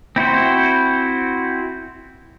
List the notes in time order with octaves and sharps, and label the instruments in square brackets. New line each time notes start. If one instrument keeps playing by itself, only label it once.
[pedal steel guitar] C4 E4 F#4 C5